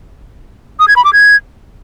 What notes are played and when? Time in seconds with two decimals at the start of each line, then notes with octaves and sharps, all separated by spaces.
0.79 D#6
0.88 G#6
0.96 B5
1.05 D6
1.13 G#6